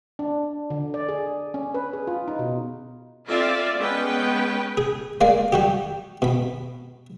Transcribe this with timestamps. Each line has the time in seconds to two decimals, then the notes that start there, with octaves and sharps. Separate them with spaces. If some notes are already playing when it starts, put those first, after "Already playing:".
0.19 D4
0.70 D3
0.94 D5
1.09 G#4
1.54 C#4
1.74 B4
1.93 G#4
2.07 F4
2.28 D#4
2.39 B2
3.28 C4 F4 A4 D5 E5 F5
3.79 G#3 B3 C#4 B4 G5
4.77 G#4
5.21 G#3 A#3 D5 F5
5.53 G3 F#4 G4
6.22 B2 B5